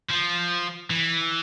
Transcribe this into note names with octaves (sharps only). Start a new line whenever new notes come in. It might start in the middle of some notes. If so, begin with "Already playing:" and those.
F3
E3